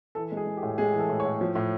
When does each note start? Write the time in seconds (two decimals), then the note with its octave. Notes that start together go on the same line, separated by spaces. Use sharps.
0.15 E3 A4
0.32 G#3
0.37 G#4
0.46 G#3
0.57 G4
0.63 A2
0.78 G#3 G#4
0.93 E3
0.99 A4
1.10 A2
1.20 C#5
1.25 A2
1.41 F3
1.55 A2